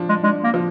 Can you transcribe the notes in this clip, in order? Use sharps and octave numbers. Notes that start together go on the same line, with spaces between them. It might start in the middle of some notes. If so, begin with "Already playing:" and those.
Already playing: F3 D4
G#3
G#3 D4
A#3
F3